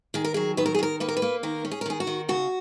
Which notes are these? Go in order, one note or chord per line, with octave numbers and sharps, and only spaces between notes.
D#3 G#4
A#4
F#3 G#4
D#3 B4
A#4
G#4
D#3 A#4
A#3 B4
A#4
B4
A#3
D#3 A#4
C#4
G#4
A#4
D#3 G#4
F#4
D#3
C#3 F#4